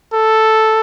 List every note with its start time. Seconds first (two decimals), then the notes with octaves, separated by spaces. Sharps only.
0.13 A4